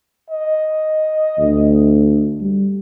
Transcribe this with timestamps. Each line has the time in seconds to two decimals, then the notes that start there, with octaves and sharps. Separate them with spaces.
0.31 D#5
1.39 D2
2.41 G3